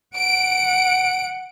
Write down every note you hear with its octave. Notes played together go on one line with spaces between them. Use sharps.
F#5 D7